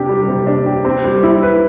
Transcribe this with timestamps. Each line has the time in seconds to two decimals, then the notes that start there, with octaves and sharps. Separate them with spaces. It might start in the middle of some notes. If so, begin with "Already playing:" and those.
Already playing: C3 D4 G4
0.09 G3
0.28 C3
0.47 D4
0.66 G4
0.85 C4
1.04 G3
1.23 E4
1.42 B4